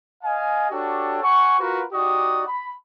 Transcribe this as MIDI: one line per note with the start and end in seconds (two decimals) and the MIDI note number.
0.23 0.68 75
0.23 0.68 77
0.23 0.68 80
0.70 1.19 62
0.70 1.19 66
0.70 1.19 67
0.70 1.19 69
0.70 1.19 73
1.22 1.56 78
1.22 1.56 80
1.22 1.56 85
1.60 1.82 65
1.60 1.82 66
1.60 1.82 70
1.60 1.82 71
1.93 2.43 63
1.93 2.43 66
1.93 2.43 67
1.93 2.43 74
1.93 2.43 87
2.48 2.71 83